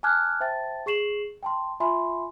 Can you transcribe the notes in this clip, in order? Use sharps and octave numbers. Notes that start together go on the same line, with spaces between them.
G#5 A5 D6 F6 F#6 G#6
C5 E5 G5 A5 A6
G#4 C#6 C7 E7 F#7
G5 A5 C6
F4 E5 G#5 B5 C6